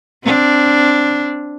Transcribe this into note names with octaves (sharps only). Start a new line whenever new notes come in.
C4 D4